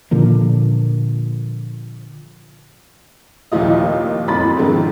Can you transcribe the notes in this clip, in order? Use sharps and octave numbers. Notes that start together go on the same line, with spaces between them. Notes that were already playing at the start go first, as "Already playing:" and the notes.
A#2 D3 F3 A#3
F1 D#2 A#2 F3 F4 D#5
F#1 F2 F#3 B5 C6 A6
G#2 B2 D3 D#3 F3 C4